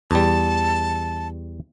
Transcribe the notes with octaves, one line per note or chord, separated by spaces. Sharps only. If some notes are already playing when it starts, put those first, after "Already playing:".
E2 G3 A5